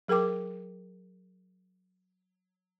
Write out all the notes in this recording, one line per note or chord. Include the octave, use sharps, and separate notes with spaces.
F#3 G#4 A#4 G5 D6